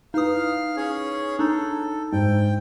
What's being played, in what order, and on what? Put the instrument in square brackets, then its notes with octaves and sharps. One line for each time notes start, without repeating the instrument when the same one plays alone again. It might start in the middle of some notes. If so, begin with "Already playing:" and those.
[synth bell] D#4 D#6 [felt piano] E4 B4 [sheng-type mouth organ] F5
[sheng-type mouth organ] C#4 G#4 C#5
[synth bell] D4 D#4 [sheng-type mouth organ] A4
[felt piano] G#2 [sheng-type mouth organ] G5